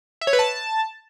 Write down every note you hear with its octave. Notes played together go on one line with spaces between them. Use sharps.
E5
C#5
B4
A5